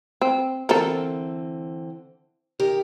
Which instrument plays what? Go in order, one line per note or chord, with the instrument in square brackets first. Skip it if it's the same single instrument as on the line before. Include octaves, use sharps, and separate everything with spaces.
[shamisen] C4
[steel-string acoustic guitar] D3 E3 C4 [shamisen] A4 A#4
[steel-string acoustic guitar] D#3 G4 A#4